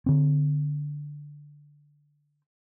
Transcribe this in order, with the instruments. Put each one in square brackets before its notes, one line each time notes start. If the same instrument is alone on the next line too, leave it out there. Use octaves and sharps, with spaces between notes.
[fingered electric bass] D3 C4